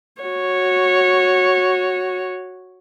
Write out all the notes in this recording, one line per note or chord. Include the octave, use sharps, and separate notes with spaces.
F#4 C#5